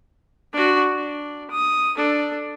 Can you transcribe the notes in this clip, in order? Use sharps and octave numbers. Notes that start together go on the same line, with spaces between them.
D4 F#4
D4
D#6
D4 A4